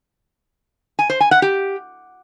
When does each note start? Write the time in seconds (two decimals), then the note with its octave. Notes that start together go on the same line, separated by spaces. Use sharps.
0.99 G#5
1.10 C5
1.20 G#5
1.31 F#5
1.42 G4